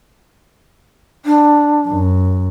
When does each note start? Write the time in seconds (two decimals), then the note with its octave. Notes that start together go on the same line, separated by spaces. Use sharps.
1.26 D4
1.88 F#2